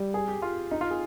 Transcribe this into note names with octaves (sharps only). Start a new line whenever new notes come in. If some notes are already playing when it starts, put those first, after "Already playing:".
Already playing: G3
G#4
G4
F4
D#4
F4
G#4